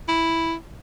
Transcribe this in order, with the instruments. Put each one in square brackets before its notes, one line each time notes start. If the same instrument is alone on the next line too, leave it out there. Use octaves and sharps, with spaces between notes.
[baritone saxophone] E4